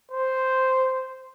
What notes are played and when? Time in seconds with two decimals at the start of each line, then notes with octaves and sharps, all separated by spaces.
0.12 C5